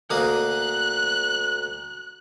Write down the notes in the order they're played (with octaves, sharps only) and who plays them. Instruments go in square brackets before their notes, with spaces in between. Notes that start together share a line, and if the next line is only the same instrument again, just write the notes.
[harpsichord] D2 A#3 D#6 [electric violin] F#6